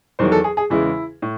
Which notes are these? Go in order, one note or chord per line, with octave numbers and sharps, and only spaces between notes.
E2 D#3 F#3 C5
A4
G#4
G#4
E2 C#3 E3 G#3 E4
A2